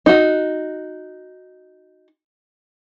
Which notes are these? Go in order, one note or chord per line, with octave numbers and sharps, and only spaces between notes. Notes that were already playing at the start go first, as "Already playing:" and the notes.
D#4 F#4